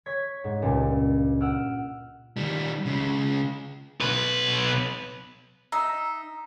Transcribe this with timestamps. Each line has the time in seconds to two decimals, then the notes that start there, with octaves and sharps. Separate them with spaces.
0.06 C#5 G#6 B6
0.44 G#2
0.62 C#2 G2 A#2
1.40 F#5 E6 F6 D7
2.37 D#3 G3
2.86 C#3 G#3
4.01 B1 B4
5.72 D#4 E5 A#5